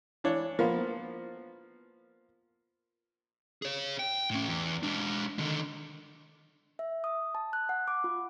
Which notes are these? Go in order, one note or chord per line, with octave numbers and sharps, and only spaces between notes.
E3 D4 C#5
F3 A#3 B3
G#4 C#5
G5
A2 C#4
E2
G#3 D4
D3 D#3
E5
D#6
A5
F#6
F#5
D6
F4